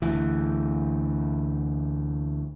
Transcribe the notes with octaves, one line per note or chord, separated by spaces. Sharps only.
D2 E3